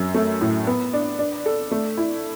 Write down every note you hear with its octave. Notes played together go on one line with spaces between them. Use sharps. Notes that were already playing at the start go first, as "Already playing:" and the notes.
Already playing: F#2
A3
A2
B3
D4
D4
A4
A3
E4